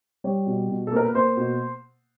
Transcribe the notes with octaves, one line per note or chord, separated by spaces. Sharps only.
G3 C#5
B2
B2
A4
A#3 A#4
B4
A#3 C5
B2